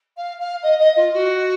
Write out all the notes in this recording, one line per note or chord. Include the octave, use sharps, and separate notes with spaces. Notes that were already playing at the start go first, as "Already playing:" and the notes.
F5
F5
D#5
D#5
F4
F#4